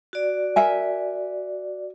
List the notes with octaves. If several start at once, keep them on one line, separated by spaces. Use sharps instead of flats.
F#4 D5
A#4 E5 G#5